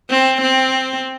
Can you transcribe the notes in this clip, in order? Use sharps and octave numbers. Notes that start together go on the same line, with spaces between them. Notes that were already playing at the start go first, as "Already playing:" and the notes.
C4
C4